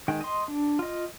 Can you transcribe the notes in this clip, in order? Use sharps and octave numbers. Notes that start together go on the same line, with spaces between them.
D#3 G#3 G5
D#5 C6
D4
F4 D#5